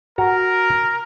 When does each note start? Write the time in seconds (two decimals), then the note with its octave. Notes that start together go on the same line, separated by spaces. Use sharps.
0.18 F#4 A#4 A#5